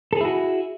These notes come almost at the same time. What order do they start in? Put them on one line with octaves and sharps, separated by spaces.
A4 G#4 E4 F#4